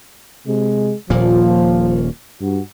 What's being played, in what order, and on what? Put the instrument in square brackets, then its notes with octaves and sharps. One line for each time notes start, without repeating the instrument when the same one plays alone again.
[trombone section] C3 G#3
[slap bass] D#1 A#2 A#3 [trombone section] F3
[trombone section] G2 F#4